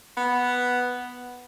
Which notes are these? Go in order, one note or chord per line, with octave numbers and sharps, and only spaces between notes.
B3